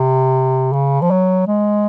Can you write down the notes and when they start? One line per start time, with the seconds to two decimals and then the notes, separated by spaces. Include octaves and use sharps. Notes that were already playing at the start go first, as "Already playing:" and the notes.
Already playing: C3
0.73 C#3
1.01 F3
1.11 F#3
1.47 G#3